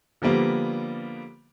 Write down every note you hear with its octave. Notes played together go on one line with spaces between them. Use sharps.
D3 F3 G3 A#3 B3